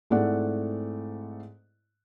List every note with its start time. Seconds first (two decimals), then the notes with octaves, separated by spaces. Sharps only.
0.10 G#2 A3 C4 E4 D5 F#5